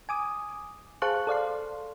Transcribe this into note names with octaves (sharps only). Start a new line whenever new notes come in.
G#5 D6 D#6
G#4 C5 F5 A5 C#6 F#6
A4 D5 F5 C6